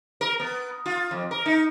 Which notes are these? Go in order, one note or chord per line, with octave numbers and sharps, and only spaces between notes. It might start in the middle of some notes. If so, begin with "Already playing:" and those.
A#4
B3
F4
F2
A#4
D#4